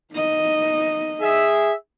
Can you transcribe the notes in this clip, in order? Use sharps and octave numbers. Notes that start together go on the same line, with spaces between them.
D#4 D#5
G#4 E5